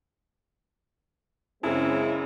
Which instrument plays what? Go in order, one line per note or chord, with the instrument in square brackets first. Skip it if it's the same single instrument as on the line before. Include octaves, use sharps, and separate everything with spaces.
[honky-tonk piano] F#2 C#3 [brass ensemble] G#3 C4 [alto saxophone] E4